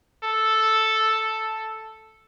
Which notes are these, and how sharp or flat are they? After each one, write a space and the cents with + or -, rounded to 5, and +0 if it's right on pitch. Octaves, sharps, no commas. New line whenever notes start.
A4 +0